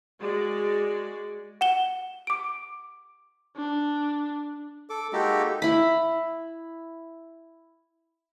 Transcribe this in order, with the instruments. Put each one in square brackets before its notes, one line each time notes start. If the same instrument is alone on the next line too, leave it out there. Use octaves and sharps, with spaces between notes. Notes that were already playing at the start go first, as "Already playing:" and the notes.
[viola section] G#3 F#4 D5
[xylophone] F#5 E7 G7
D6 D7
[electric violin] D4
[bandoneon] A4 D6
G#3 A#3 D#4 F#4 G4 A4
[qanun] E4 B5